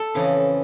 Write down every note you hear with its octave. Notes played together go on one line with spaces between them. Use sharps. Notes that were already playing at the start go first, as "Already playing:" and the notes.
Already playing: A4
F2 C#3 E3